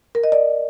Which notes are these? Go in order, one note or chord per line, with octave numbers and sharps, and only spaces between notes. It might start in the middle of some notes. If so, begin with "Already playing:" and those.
A#4
D#5
D5